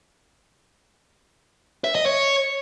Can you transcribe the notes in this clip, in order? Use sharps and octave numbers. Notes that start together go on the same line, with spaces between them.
E5
D#5
C#5